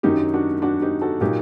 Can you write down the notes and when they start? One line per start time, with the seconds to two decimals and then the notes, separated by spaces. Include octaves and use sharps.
0.03 F#2 D#3 F#3 D#4 G4
0.33 D4 F#4
0.62 D4 F#4
0.82 D#4 G4
1.02 F#4 A4
1.21 A#2 F#3 D#4 G4